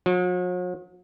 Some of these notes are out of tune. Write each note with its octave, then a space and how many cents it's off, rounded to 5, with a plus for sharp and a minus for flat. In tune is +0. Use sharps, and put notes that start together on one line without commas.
F#3 -45